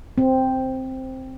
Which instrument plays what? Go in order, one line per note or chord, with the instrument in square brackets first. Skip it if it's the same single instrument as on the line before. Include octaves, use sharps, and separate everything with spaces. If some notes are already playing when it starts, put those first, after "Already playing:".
[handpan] C4